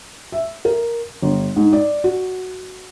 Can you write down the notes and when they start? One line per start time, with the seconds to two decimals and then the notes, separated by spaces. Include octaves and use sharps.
0.32 E5
0.65 A#4
1.22 G1
1.56 G#2
1.73 D5
2.04 F#4